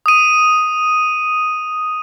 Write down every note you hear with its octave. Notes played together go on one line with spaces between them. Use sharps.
D#6 D#7